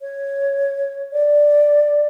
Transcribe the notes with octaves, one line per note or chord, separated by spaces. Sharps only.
C#5
D5